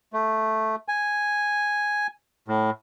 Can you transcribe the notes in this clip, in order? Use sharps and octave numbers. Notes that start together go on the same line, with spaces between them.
A3
G#5
A2